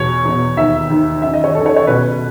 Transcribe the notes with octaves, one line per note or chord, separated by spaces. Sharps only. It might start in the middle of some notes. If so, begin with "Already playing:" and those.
Already playing: E2 B2 C#5
E2 B2
D#2 D#3 E5
D#2 D#3
F#2 D#3 E5
D#5
C#5
F#2 D#3 A4
C#5
C#5
C#2 B2 B4